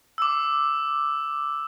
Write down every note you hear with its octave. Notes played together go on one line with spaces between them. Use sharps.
D6 E6